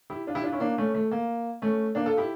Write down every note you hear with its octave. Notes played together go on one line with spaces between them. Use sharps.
E4 G4
D4 F4
E4 G4
D4 F4
C#4 E4
A#3 D4
A3 C#4
A3
A#3
A3 C#4
A#3 D4
F4 A4
E4 G4